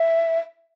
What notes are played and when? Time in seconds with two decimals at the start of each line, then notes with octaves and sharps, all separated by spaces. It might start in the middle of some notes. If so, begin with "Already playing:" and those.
Already playing: E5